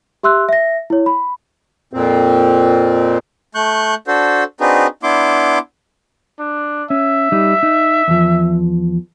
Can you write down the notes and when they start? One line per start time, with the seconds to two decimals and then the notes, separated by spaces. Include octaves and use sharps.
0.23 G4 E5 C6 E6 F#6
0.49 E5 A#6
0.90 E4 C#5
1.06 B5
1.93 F2 A#2 C4
3.55 A3 C#6 F#6 G6
4.07 D4 F#4 A4 C5
4.61 C4 D4 D#4 F#4 G#4 B4
5.03 B3 D4 E4 C6 D6
6.39 D4
6.90 C#4 E5
7.32 G3 D#4
7.63 D#4
8.08 E2 F3